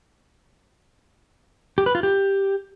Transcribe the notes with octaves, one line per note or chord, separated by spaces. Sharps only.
G4
B4
F4
G4